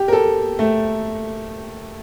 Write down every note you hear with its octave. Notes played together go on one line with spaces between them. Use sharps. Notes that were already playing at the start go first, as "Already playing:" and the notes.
Already playing: G4
A#4
A4
A3